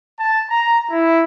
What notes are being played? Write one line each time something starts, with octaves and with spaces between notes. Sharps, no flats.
A5
A#5
E4